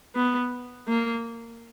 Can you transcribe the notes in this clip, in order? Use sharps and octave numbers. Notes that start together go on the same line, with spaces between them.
B3
A#3